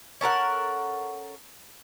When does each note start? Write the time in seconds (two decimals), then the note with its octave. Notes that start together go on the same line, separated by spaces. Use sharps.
0.21 C#4 A4 A#4 F#5